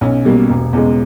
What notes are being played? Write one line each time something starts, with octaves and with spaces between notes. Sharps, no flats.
B1 C#4
B2 G3 A#3
E1
E2 C#3 G#3